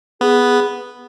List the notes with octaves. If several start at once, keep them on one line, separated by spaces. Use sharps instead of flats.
B3 G#4